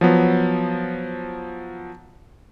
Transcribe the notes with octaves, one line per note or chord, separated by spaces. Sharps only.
F3 F#3 B3